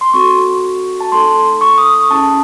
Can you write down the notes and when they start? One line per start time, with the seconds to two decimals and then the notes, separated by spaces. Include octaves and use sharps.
0.01 C6
0.14 C4 F#4 A4 C#6
1.01 A5
1.12 A3 D#4 A4 C6
1.61 C#6
1.78 D#6
2.11 C#4 E4 G#4 A5